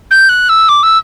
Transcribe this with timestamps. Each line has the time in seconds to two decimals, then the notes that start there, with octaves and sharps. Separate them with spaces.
0.11 G6
0.29 F#6
0.49 E6
0.69 D6
0.83 E6